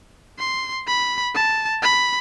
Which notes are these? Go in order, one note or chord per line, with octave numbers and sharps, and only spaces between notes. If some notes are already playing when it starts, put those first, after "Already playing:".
C6
B5
A5
B5